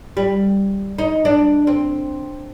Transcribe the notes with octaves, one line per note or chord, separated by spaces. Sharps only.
G3
D#4
D4
C4